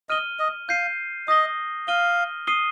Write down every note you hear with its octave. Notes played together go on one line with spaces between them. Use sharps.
D#5 F6 D#7 G7
D#5
F5 G6 C7 D#7
D#5 D#6 A#6 G7
F5 F6 D#7 G7
D#6 C7 D#7 G7